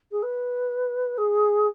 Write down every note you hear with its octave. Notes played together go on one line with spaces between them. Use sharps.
G#4
B4
G#4